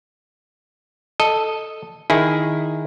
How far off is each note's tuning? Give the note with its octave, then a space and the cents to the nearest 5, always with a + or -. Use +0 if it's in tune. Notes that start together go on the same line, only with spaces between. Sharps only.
A4 +0 D#5 +0
D#3 +0 E4 +0 G#4 +0